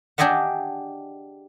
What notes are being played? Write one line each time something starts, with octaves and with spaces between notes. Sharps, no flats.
D4 G4 G#4 D#5 E5 F#5